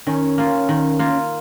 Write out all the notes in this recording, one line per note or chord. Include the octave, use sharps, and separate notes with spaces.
D#3 C#4
A#3 F4
D#3
A#3 F4